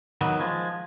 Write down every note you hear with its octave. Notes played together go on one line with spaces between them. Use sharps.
D#3 F#3 B3
F3 G#3